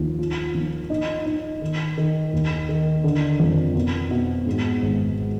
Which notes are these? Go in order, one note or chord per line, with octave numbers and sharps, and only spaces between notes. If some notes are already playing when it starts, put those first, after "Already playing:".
Already playing: D#2 F3
F4
F3
D#4
D#4
D#3
D#3
D#2
D#3
D3
F2
B2
B2
G#2
G#1